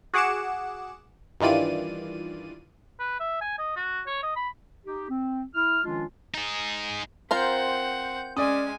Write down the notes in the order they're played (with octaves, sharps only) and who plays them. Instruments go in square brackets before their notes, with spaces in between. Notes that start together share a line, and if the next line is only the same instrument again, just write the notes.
[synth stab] F#4 G#4 F#5 D6 C#7 E7
G2 D#3 E3 F4 D5 D#7
[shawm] B4
E5
G#5
D#5
F#4
C#5
D#5
B5
[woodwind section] D#4 G4
C4
E4 F6
D#3 F3 G#3 C#4 D4 F4
[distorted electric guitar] D#4 G#4
[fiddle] C4 F#5 [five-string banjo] F4 A#4 C5 [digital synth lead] G6
[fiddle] G#3 G#5 [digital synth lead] C#4 [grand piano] D5 D#6